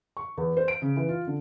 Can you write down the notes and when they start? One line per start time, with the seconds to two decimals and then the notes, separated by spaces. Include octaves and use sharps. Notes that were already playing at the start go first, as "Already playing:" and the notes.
0.17 C#6
0.37 E2
0.57 C5
0.68 D7
0.82 C#3
0.96 E3
1.09 F4
1.27 D3